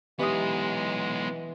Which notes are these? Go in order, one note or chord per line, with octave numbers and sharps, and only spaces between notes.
E3 G#3 B3 D#4 G4 D#5 D#6